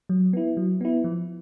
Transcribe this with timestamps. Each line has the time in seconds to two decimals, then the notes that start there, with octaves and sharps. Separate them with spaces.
0.09 F#3
0.33 B3 E4
0.57 F#3
0.81 B3 E4
1.04 F3